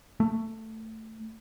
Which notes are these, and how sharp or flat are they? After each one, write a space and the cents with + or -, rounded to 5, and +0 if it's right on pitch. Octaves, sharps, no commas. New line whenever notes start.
A3 +10